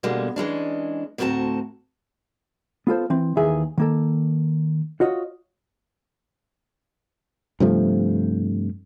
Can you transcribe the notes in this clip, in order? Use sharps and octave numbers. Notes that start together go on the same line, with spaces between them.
B2 D3 G3 G#3 A#3
E3 G#3 C#4 D4
D2 A2 C4 F#4 A5 A#5
B3 F4 A4 C5
E3 C4
D#2 D#3 E3 G#4 E5
D#3 A#3 A4
F4 F#4 C#5 D#5
G2 C3 F3 A3